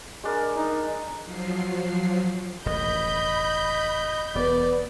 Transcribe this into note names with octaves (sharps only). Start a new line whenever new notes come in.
G#3 D4 A#4
D#4
F3 F#3 C7
E1 A1 D#5 B5 G6
E1 B3 D5